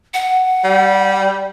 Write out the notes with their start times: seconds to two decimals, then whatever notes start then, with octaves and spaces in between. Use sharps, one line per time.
0.14 F#5
0.64 G3